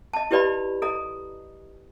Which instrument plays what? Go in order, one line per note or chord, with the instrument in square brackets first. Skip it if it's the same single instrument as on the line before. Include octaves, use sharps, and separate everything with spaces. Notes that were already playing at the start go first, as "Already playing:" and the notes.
[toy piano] D#5 A5
E4 G4 B4 D5 D#5 B5
A4 D#5 A#5